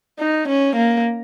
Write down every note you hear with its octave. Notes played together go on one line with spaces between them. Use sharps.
D#4
C#4
A#3